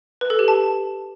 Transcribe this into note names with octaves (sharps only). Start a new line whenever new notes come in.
B4
A4
G4
A5